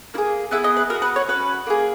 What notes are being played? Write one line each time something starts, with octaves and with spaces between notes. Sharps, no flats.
A#3 E4 G#4
B3 E4 G#4 E5
D#5
B4
B3 F#4 A#4
B4
C#5
C#4 F#4 B4
A#3 D#4 G#4